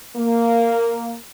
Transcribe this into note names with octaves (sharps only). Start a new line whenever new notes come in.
A#3